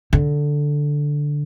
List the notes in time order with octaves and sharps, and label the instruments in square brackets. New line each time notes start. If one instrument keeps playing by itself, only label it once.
[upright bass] D3